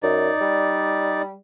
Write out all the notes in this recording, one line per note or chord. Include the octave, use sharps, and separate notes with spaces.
F#2 D#4 D5
G3